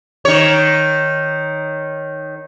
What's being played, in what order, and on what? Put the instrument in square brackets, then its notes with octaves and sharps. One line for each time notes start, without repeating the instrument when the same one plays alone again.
[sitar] D#3 C#5